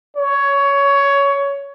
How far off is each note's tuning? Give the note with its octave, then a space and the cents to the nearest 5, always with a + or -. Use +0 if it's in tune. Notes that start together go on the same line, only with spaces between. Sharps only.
C#5 +15